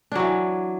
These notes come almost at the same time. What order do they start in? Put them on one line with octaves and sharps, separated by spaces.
D4 F#3 E3